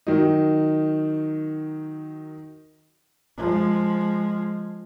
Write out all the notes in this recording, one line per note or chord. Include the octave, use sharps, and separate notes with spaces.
D#3 F#3 D#4
F3 G#3